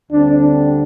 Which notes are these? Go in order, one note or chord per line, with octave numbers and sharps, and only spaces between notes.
D2 D3 G3 C4 D4
D4